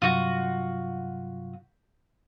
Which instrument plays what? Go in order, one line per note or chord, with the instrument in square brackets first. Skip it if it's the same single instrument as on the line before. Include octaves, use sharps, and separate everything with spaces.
[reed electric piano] G2 C3 F#3 [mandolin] F4 F#4